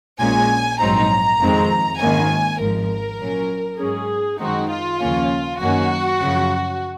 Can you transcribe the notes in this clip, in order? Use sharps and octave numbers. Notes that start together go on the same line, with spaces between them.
A#1 A#2 G#3 C#4 G#5
A#1 G#2 F#3 C4 D#4 A#5
F2 D#3 G#3 C4
G#1 G#2 D#3 A#3 C#4 G#5
G#1 G#2 F3 A#4
A#2 F#3 C#4
G#2 F#3 C#4 G#4
F#2 D#3 G#3 C4 D#4 F#4
F4
D#2 C#3 F3 A#3 C#4
F#2 D#3 A#3 C#4 F#4
F#2 C#3 F3